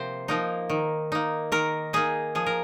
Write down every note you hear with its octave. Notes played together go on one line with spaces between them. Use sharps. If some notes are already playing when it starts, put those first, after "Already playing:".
Already playing: C3 F3 A#3 C5
F3 A#3 D#4
D#3
A#3 D#4
D#3 A#4
A#3 D#4 G#4
F3 G#4
A#4